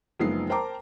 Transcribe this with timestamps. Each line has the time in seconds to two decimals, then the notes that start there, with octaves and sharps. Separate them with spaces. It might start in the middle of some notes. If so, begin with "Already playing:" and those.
0.19 F#1 F3 G#3 B3 D#4 C7
0.49 A#4 C5 G5 A5 A#5 D6